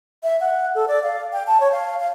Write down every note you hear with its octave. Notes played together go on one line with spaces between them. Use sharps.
E5
F#5
A4
D5
F5
G5
A5
C#5
F5
F5